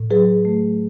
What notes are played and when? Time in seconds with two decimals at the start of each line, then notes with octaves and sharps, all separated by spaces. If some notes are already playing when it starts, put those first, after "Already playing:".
Already playing: A2
0.10 F#3 G#4 B4
0.45 A3